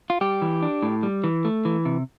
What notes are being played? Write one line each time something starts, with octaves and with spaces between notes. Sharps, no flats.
F4
G3 G4
E3
D4
A2
G3
E3
A3
E3
C3